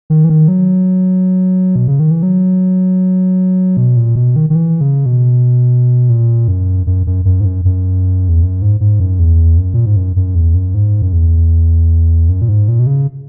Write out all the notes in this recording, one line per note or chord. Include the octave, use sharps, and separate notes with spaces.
D#3
E3
D#3
F#3
B2
C#3
D#3
E3
F#3
B2
A#2
B2
D#3
D#3
E3
C#3
B2
A#2
F#2
F#2
F#2
F#2
G#2
F#2
F#2
E2
F#2
G#2
G#2
F#2
E2
F#2
A#2
G#2
F#2
F#2
E2
F#2
G#2
F#2
E2
F#2
A#2
G#2
A#2
B2
C#3